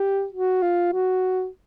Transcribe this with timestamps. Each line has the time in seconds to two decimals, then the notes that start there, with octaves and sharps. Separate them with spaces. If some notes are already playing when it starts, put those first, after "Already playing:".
Already playing: G4
0.32 F#4
0.62 F4
0.93 F#4